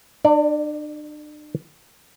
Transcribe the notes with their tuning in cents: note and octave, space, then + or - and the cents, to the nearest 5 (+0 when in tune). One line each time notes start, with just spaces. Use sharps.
D4 +40 D5 +0